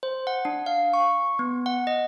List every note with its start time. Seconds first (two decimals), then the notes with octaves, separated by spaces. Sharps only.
0.03 C5
0.27 F#5
0.45 D4
0.66 F5
0.94 C#6
1.39 B3
1.66 F#5
1.87 D#5